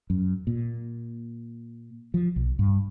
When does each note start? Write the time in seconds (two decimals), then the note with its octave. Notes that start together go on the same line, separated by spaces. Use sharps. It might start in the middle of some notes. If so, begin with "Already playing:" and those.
0.10 F#2
0.47 A#2
2.14 F3
2.36 B1
2.59 G2